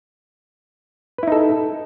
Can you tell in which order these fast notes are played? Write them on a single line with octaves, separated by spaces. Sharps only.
B4 E4 D#4 A4